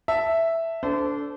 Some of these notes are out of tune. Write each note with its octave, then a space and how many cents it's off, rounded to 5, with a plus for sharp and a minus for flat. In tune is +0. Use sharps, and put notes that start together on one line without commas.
E5 +0 A5 +0
D4 -25 A4 +0 C5 -30